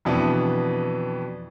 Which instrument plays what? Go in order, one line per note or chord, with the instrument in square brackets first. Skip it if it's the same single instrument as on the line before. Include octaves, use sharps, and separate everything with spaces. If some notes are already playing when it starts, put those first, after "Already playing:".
[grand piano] F2 B2 E3 B3 D4